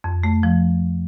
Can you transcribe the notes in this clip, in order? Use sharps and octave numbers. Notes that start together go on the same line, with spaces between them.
F2
A3
F3